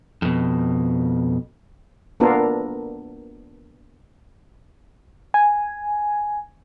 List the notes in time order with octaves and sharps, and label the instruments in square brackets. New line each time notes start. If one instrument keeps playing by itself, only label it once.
[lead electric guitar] F2 B2
[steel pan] A#3 B3 D4 F4 A4 A#4
[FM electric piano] G#5